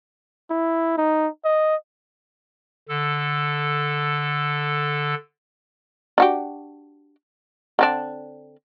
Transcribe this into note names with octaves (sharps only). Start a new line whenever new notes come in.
E4
D#4
D#5
D3 A4
D4 F#4 G4
D3 C4 D4